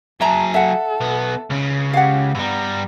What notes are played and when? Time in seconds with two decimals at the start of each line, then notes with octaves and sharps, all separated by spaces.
0.21 F#3 G#4 E5 A5 A#5
0.54 A4 E5 F#5
1.01 B1 B3
1.50 C#2 C#3
1.93 C#4 G4 F5 F#5
2.35 G2 G3 B3 A#5